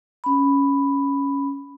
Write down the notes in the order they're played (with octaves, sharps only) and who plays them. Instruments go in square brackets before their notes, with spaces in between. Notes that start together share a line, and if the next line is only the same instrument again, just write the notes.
[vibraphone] C#4 B5